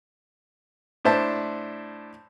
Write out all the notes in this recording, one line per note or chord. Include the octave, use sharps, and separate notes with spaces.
A2 D4 C5 E5 A5